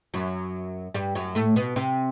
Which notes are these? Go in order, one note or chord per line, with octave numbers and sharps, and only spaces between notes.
F#2 F#3
G2 G3
F#2 F#3
A2 A3
B2 B3
C3 C4